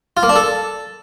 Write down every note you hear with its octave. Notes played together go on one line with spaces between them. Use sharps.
F4
A#3
D4
A4